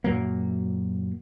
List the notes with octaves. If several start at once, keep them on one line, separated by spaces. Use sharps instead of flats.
F#2 A#2 F#3 A#3